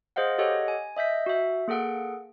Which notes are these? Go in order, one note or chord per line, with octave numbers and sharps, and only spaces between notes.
G#4 C5 D#5 F5 F#5
G4 A4 C#5 D#5 F#5
G#5
D#5 E5 G6 B6
F#4 E5
A#3 G#4 A4 F#5 D7